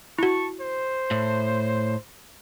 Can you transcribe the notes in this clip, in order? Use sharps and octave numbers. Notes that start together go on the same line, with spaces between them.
E4 F#4 A5 C#6
C5
A2